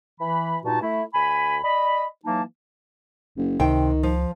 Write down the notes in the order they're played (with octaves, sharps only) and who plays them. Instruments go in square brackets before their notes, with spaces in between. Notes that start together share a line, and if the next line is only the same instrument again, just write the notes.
[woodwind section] E3 B5
G2 A#2 D#4 F#4 A5
A3 E4
D2 G#5 B5
D5 D#5 B5
E3 F#3 A#3 D#4 A5
[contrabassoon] F#1
[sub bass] C#2 [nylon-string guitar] C3 G5 [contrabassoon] D#3
[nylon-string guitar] F3